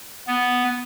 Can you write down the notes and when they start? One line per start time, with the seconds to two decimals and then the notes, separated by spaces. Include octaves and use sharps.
0.27 B3